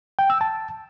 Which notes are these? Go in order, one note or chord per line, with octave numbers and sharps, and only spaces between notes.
G5
E6
A5